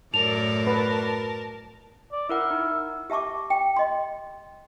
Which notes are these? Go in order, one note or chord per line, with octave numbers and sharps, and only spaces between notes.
F#2 A2 A#4 D5 A5 F7
B4
D5
E4 A#4 E5 F#5
D#4
G4 E5 A5 C#6 D6
G5
D#5 C6